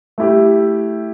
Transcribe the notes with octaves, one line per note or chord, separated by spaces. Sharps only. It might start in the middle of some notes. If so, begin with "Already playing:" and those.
A3 E4 G4